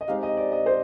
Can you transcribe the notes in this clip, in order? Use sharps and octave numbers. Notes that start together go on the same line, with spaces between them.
D#5
G#3 C4 D#4 G4 F5
D#5
D5
D#5
C5